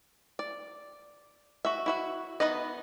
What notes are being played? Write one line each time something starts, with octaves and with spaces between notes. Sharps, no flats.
D5
F#4 E5
E4 F#4 E5
E3 B3 D#4 B4 D#5